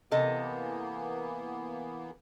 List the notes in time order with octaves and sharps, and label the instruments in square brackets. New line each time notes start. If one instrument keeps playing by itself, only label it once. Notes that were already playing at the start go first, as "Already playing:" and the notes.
[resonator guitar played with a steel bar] C3 A4 D#5 [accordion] E3 A#3 B3